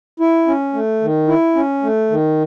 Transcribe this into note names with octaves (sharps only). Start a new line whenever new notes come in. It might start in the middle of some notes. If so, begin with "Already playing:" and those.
E4
C#4
A3
D#3
E4
C#4
A3
D#3